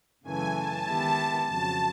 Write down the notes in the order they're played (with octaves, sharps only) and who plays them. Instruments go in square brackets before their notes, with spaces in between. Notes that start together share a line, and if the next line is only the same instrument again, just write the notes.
[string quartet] F#2 C#3 E3 A3 [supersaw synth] G#5
[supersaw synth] A5
[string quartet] D#3 G#3 B3 E4 G4
[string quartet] F2 C#3 F#3 [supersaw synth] A5